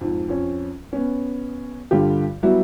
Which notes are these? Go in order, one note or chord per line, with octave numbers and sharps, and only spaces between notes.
F2 G#2
F2 C#4
B3 C#4
G2 D3 G3 F4 G4
F#3 G3 B3 E4 F#4